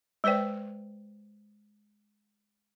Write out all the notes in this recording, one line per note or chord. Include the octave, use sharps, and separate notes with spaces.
G#3 B4 C5 D5 G5